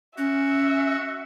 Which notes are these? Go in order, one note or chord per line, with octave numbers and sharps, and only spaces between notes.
C#4 F#4 E5